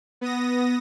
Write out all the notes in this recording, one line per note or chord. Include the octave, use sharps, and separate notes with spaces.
B3 D#6 A#6